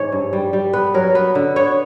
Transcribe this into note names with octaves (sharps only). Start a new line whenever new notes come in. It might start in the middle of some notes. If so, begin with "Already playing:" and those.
Already playing: G#2 E3 B3 C#5
G2
G3
G3
B3 B4
F#3 A#4
B3 B4
D3
B3 C#5